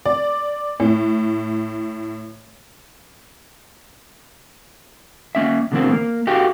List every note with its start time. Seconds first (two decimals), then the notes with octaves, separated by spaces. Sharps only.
0.06 D5
0.80 A2
5.35 A#3 C#4 E5
5.72 B2 D3 E3 A#3 C4
5.92 A#3
6.27 F#4 G4 A4 F5 G5